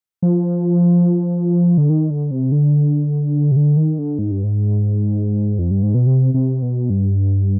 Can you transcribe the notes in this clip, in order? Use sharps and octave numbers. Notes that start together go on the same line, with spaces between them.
F3
D3
D#3
D3
C3
D3
C3
D3
D#3
D3
G#2
G2
G#2
F2
G2
G#2
B2
C3
C3
B2
G2